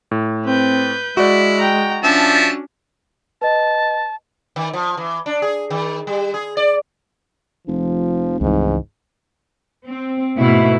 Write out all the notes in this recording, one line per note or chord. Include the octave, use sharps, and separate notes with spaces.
A2
C4 B4 G6
G#3 E4 F#4 D5
G5 A#5
F3 C#4 D4 E5 A5
B4 D#5 A5
D#3
F3
E3
D4
G#4
D#3
G3
G#4
D5
F1 F3
F1 C#2 G#2 E3
C4
G#2 B2 A3 E4